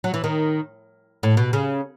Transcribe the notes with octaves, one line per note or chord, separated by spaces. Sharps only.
F#3
E3
D#3
A2
B2
C#3